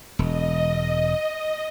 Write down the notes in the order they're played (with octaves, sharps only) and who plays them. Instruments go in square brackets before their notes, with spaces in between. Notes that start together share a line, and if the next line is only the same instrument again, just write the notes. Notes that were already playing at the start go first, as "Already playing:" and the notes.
[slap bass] E1 [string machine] D#5